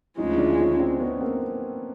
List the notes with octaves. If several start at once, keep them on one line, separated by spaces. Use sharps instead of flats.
D2 C#3 F3 G#3 D#4 F4
D4 E4
C#4 D#4
C4 D4
B3 C#4
A#3 C4